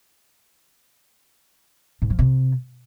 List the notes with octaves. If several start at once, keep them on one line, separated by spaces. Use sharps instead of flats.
G#2
F3
C3